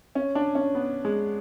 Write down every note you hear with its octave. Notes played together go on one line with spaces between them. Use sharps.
C#4
D4
C#4
B3
G#3